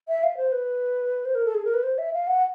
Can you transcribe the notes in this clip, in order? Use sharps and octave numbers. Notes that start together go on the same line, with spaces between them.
E5
F5
C5
B4
C5
A#4
A4
G#4
A#4
B4
C5
E5
F5
F#5